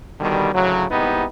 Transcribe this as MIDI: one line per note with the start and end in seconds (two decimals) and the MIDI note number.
0.20 0.49 47
0.20 0.49 50
0.20 0.49 51
0.20 0.49 55
0.53 0.85 38
0.53 0.85 45
0.53 0.85 49
0.53 0.85 54
0.90 1.25 36
0.90 1.25 44
0.90 1.25 59
0.90 1.25 63
0.90 1.25 64
0.90 1.25 67